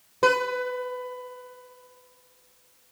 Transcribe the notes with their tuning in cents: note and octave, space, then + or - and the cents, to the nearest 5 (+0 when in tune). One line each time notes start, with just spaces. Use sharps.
B4 +20